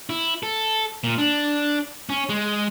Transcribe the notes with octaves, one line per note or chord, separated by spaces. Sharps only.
E4
A4
A#2
D4
C#4
G#3